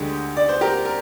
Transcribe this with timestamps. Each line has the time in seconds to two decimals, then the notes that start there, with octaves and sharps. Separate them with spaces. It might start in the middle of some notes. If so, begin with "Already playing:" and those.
Already playing: D2 D3 G#3 D#4 G4
0.37 D5
0.49 C5
0.61 G4 A#4
0.85 A#4